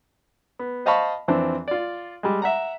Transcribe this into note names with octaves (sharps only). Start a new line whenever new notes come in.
B3
C5 D#5 F5 A5 B5 C#6
F2 E3 C4 D4
F4 D5
G3 G#3
E5 F#5 A#5